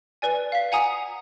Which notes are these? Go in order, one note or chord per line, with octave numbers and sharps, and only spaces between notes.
B4 D5 G#5
F5 B6
F#5 G#5 A#5 D#6